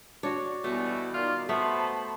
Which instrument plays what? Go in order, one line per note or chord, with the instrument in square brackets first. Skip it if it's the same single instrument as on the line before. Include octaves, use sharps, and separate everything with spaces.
[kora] D4 F#4 [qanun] C#5
[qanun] B2 [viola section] E3 G3 B3 [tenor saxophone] A3
[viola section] D#3 D5 [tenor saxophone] F4
[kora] A3 [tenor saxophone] B3 [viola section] C5 A5 B5 [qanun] E5